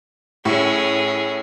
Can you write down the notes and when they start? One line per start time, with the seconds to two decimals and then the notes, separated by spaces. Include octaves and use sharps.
0.45 A2 C#4 G#4